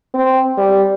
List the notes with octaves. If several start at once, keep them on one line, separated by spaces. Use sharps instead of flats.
C4
G3